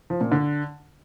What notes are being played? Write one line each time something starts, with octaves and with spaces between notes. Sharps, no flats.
F3
A#2
D3